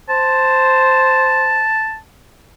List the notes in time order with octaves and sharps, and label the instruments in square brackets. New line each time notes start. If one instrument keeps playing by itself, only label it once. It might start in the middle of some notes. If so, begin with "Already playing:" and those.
[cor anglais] C5 [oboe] A5